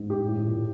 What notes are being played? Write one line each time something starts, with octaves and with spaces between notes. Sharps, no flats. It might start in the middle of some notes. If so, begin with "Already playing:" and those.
Already playing: G#2
A2 G4
A2
A#2